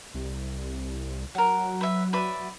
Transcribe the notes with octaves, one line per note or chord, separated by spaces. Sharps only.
C2
F#3 A#4 F#5
B4 E5
B4 D5 E5